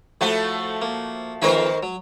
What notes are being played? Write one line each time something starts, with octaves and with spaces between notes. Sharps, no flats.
A2 F3 A3 F#4
A#3
F2 D#3 E3 A#4 C5 B5
F#3